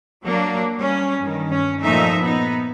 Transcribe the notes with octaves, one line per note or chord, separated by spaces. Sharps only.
F#3 A#3 D4
G3 C#4
G2 D#3
C#4
A#2 F3 A3 D#4 E5
B3 D#4